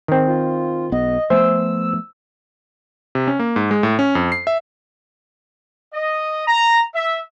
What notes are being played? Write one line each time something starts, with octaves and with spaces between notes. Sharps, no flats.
D#3 C4
F4
B1 B3 D#5
F3 A3 B3 C5 E5 G#5 E6
C3
C#4
A#3
G#2
G#3
A2
C#4
F2
C7
E5
D#5
A#5
E5